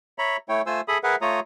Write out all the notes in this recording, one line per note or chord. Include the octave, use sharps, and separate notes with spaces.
C#5 E5 A#5 B5
A3 E4 C#5 G5
A3 F4 C5 G#5 E6
G#4 A4 E5 B5 D#6
G#4 A#4 B4 E5 F#5
A3 F4 C#5 A#5 D#6